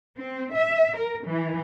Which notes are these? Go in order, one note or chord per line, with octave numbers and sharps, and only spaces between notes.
C4
E5
A#4
E3